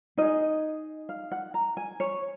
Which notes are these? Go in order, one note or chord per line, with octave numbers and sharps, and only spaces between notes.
D#4 G#4 D#5
F5
F#5
A#5
G#5
C#5